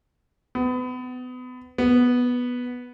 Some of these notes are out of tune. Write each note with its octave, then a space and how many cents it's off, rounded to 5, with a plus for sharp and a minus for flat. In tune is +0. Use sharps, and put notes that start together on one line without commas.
B3 +30
B3 -5